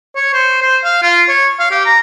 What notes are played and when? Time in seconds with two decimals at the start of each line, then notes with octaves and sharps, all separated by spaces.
0.16 C#5
0.33 C5
0.62 C5
0.84 F5
1.03 F4
1.29 C#5
1.60 F5
1.71 G4
1.86 A#5